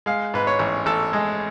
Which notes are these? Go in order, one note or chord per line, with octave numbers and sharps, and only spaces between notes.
G#3 F5
G#2 B4
C#5
A1
A1 A4
G#3